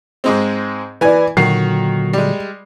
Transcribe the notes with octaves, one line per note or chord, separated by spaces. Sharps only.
G#2 G#3 C4
E3 B4 D5 G#5
A#2 D3 D#3 F#3 F#4 C7
G3 G#3